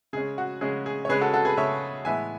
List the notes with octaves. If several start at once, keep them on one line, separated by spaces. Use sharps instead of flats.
C#3 G#3 C#4 G#4
F#4
C#3 G#3 C#4 G#4
G#4
C#5
C#3 G#3 C#4 G#4 B4
F#4 A4
F#4 A4
G#4 B4
C#3 G#3 C#4 C#5 E5
A2 E3 G#3 B3 E5 G#5